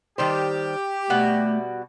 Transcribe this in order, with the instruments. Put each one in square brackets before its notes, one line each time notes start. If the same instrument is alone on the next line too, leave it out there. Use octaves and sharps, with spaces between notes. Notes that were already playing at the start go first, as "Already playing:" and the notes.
[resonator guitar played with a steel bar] D#3 G3 C5 [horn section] G4
[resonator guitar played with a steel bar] B2 G3 [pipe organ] A3 [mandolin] F#4